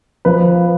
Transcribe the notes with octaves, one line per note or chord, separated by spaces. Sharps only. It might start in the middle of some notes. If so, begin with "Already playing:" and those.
F3 B4